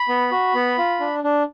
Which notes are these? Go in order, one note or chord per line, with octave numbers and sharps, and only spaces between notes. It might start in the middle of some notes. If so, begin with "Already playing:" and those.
Already playing: B5
B3
F#4
B3
F4
D4
D4